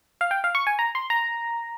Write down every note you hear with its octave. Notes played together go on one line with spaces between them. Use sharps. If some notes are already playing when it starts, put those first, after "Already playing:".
F5
G5
F5
C#6
G#5
A#5
C6
A#5